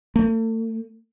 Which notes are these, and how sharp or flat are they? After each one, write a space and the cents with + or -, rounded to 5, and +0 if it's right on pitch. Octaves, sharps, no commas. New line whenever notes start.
A3 +40